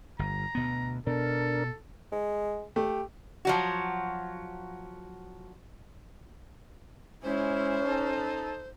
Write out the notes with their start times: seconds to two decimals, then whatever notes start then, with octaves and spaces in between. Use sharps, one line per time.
0.19 G1 A#5
0.55 D2 B2 B3
1.07 B2 D4 A4 A#4
2.12 G#3
2.76 A3 G4
3.45 F3 F#3 F#4
7.23 G#3 C#4 E4 C5
7.85 D#4 A4